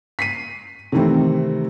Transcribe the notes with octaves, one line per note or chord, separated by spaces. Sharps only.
B6 C7 D#7
C3 D#3 E3 A3 C4